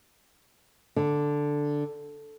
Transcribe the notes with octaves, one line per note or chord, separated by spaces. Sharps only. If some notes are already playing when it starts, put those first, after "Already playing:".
D3